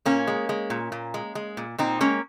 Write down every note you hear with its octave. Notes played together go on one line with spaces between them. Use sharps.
A#2 A#3 C#4
G#3
G#3
A#2
A#2
G#3
G#3
A#2
A#2 C4 D#4
G#3 A#3 C#4